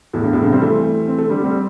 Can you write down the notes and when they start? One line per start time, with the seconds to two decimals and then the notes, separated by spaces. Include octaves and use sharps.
0.13 E2 A2
0.23 G2
0.33 E2 A2
0.42 G2 C3
0.52 G3 C4
0.62 E3 A3
1.08 C4
1.18 A3
1.29 D3 G3
1.44 G3 C4